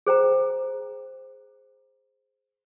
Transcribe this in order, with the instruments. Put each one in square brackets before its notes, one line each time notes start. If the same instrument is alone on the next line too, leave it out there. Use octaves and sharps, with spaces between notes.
[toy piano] G#4 C5 G5 A#5